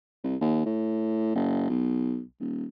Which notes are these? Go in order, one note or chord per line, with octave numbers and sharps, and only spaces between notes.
C2
D#2
A2
F#1
B1
D#1